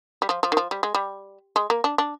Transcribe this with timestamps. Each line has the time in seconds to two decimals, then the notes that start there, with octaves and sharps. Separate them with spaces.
0.22 G3
0.29 F3
0.43 F3
0.52 D#3
0.57 F3
0.71 G3
0.83 G#3
0.95 G3
1.56 G#3
1.70 A#3
1.84 D4
1.98 D4